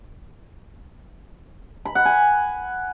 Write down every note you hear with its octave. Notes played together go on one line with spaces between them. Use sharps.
B5
F#5
G#5